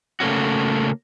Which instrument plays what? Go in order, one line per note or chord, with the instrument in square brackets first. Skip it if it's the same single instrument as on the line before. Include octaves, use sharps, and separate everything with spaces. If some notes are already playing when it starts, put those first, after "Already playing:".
[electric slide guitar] C#3 A3 A#3 C#4 F#4